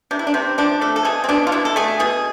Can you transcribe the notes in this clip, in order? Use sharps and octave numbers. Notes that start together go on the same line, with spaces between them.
C3 D4
E4
D4
C3 C4
F3 D4
A3 A4
A4
B2 G#4
C4
B2 D4
F4
B2 E4
A4
A3 G#4
B2 G#4